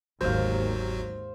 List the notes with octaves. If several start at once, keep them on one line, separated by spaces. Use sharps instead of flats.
G1 D#2 G#2 F#3 F#4 C5 F5